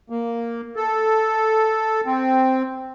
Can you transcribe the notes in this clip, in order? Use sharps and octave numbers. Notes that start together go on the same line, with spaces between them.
A#3
A4
C4